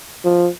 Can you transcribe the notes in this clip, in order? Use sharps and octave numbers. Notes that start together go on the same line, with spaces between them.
F3